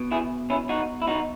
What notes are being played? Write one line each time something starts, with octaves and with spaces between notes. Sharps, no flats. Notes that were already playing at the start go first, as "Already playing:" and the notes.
Already playing: B2
E4 G#4
C#4 E4
D#4 F#4
E4
D#4 F#4